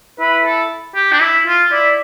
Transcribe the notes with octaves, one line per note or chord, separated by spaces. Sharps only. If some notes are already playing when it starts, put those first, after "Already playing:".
E4 B4
A4
G4
D4
E4
F4
E4 D5